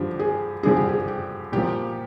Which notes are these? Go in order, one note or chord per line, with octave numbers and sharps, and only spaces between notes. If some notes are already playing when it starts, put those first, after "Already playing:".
Already playing: G2 D3 F3 G4
G#4
G2 D3 F3 G#4
G4
G#4
G4
A#2 F3 G4